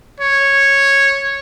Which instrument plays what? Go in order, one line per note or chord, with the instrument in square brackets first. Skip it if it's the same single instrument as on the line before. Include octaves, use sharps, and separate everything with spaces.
[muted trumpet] C#5